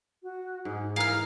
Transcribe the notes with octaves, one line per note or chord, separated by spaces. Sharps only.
F#4
G#2 G#4
E3 G#4 A#4 F5 A#5 F6